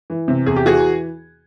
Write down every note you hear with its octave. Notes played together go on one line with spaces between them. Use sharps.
E3
C3
E2 G#4
G4
E3 F#4 G#4